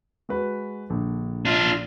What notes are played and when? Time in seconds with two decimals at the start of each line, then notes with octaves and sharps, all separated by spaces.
0.29 G#3 F#4 B4
0.90 A#1 D3
1.45 D4 F4